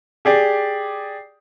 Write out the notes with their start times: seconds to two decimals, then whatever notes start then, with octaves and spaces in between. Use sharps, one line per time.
0.25 G4 G#4 D5